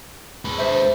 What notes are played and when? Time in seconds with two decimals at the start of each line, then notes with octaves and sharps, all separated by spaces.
0.45 G#3 B4
0.58 D4 C5 E5